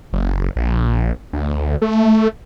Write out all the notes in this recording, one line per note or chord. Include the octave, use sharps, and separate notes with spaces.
F#1
A#1
D2
A3